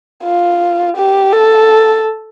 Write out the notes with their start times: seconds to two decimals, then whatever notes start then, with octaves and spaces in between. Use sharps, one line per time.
0.24 F4
0.97 G4
1.33 A4